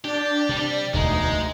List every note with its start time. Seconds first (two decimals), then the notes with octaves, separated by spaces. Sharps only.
0.04 D4 G4 D5
0.49 C3 G3
0.94 E1 D2 G#3 D#4